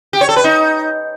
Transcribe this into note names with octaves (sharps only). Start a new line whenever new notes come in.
G4
C#5
A4
B4
D#4